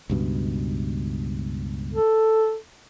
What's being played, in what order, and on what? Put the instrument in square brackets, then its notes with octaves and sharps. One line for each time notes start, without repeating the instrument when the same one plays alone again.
[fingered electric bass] C#2 G2 B2
[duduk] A4